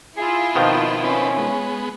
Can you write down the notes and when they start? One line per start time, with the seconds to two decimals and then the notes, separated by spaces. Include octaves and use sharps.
0.17 E4 F4 G#4
0.55 B2 D#3 F3 C4
1.04 C4 C#4 B4
1.38 G#3 B3